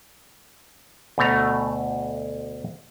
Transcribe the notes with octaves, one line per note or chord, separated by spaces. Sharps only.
D2 B2 A3 A#5